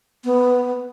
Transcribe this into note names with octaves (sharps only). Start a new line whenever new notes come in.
B3